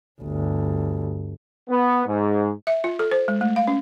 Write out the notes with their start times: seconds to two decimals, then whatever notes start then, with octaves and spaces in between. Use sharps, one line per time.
0.21 G1 D2
1.70 B3
2.07 G#2
2.67 E5
2.84 F4
2.99 A4
3.12 C5
3.28 G#3
3.41 A3
3.56 F5
3.68 C#4